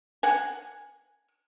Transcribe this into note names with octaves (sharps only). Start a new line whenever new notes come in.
F#5 G#5